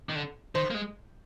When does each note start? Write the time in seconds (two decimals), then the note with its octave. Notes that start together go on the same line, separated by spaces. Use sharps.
0.09 D#3
0.15 D3
0.55 D#3 C5
0.71 A#3
0.74 G#3